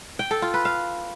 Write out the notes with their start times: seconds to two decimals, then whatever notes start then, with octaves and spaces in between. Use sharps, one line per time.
0.19 G5
0.31 A4
0.42 F4
0.54 B4
0.65 F5